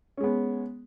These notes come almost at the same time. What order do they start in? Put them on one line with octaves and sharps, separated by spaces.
C#4 G#3 B3